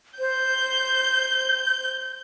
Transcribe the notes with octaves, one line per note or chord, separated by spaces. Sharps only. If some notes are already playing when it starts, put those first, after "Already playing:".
C5 G6